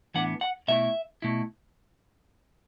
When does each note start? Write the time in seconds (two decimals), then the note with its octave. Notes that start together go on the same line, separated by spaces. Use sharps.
0.14 A2 E3 B3 D4 F#5
0.41 F#5
0.68 B2 A3 E4 E5
1.22 B2 A3 E4